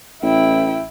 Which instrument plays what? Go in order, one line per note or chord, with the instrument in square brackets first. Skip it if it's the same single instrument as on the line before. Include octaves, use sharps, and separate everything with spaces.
[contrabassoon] A1 [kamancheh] E4 G5